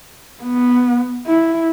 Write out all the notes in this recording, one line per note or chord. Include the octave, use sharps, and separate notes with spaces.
B3
E4